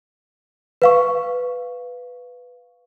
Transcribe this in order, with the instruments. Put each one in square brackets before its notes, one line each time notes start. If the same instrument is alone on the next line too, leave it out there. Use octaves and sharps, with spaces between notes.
[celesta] B4 F5 C#6